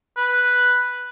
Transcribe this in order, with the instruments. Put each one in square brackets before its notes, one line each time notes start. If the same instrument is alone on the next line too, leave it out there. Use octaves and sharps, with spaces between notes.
[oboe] B4